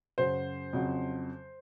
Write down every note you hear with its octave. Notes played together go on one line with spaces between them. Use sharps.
F#2 C#3 F#3 C5
F2 C#3 F#3